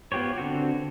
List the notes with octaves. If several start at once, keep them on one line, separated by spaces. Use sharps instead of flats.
B3 F4 G4 C5 C#5
D3 C4 F#4